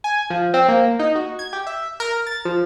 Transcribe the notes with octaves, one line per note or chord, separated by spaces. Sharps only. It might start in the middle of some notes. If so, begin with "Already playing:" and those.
G#5
F3
C4
A#3
D#4
F#4
G#6
G4
E5
A#4
A6
F3